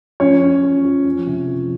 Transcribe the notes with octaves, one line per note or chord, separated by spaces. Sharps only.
F3 C#4 C#5
F3
F3
F3
F3
C3
F3